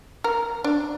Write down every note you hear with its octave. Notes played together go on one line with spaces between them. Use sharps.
A#4
D4